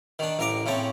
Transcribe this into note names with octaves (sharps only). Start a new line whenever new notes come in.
D#3 D4
A1 A#4 A#5 D6
A2 C#3 C4 A5